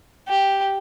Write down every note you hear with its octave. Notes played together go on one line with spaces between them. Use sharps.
G4